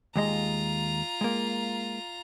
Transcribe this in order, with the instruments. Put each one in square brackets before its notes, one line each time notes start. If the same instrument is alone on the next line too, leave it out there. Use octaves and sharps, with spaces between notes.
[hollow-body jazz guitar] D#2 G#3 D#5 [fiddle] F4 A#5
[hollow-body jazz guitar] G#3 A#3